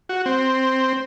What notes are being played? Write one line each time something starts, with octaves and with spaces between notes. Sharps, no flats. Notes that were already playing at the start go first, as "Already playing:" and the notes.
F#4
C4